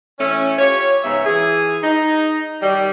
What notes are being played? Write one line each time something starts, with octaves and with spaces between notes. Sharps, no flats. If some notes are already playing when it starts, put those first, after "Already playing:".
E3 A3 C#4
F4 G4 C#5
G#2 C#3 F#3 B3 E5
E3 G#4
D#4
D#3 F#3 G3